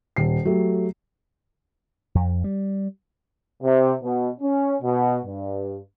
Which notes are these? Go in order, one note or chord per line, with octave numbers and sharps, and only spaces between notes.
D#1 C7
F#3 A3 G4
F2
G3
C3
B2
C#4
B2
G2